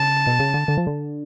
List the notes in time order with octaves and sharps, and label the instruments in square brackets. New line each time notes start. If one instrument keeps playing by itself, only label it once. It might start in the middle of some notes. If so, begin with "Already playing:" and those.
Already playing: [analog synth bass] C#3 [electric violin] A5
[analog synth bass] B2
C#3
D3
D3
F3
D3